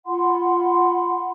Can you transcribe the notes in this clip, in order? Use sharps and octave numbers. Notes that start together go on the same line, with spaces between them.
F4 F#5 B5 C6